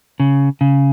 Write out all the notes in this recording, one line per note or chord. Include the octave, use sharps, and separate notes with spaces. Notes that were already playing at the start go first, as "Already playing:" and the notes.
C#3
C#3